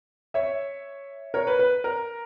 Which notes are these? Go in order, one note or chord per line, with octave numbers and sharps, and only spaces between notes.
C#5 E5
A#4 C#5
B4
B4
A#4